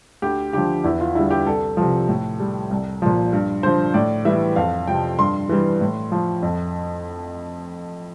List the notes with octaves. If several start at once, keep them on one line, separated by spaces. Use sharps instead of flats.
D2 G4
D3 F3 G4
E2 E4
F4
D3 G3 E4
G4
C2 A4
C3 F3
A2
G3
C2
A#2 F3
G2
D3 F3 C5
A2 D5
E3 G3 E5
F2 F5
C3 F3 G5
G2 C6
E3 G3
A2
F3
F2